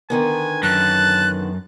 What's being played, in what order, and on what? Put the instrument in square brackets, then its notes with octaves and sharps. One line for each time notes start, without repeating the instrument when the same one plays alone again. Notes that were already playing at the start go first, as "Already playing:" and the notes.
[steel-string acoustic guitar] D3 D#3 B3 [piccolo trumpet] G#5
[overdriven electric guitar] F#2 [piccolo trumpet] A5 [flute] F#6